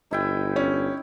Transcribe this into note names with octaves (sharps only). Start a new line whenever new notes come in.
G1 D#4 E4 G5
C#4